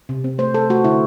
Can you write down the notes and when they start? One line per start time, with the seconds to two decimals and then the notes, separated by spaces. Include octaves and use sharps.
0.09 C3
0.24 C4
0.38 A3 C5
0.54 A3 A4
0.70 A3 F#4
0.84 D3 E4